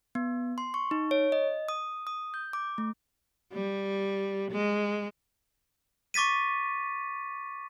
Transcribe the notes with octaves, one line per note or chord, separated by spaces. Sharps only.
B3
C6
C#6
D#4
C#5
D#5
D#6
D#6
G6
D6
A3
G3
G#3
C#6 D6 A6 B6 D#7